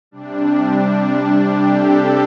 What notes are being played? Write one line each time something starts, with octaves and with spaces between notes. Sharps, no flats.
C3 G3 D4
D4
D4
G4
A4